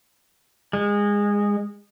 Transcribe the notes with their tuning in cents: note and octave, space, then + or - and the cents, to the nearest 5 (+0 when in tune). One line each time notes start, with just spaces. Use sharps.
G#3 -20